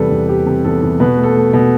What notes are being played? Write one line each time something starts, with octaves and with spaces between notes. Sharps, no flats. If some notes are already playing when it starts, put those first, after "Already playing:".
Already playing: E2 C3 G3 A4 B4
E2
G3 G4
C3
E2 A4
E2
B2 B4
A3
A4
A3
B2